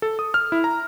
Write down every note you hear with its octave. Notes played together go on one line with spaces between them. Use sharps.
A4
D#6
F6
E4
A#5